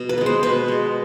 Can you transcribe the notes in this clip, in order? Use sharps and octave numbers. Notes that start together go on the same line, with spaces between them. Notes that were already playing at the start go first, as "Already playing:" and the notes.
Already playing: B2
B4
G#3 B3
C5
B2 B4
G#3 B3